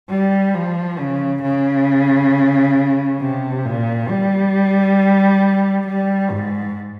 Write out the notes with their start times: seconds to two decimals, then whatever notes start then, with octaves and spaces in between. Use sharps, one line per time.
0.10 G3
0.55 F3
0.99 C#3
1.43 C#3
3.21 C3
3.65 A#2
4.10 G3
5.87 G3
6.31 G#2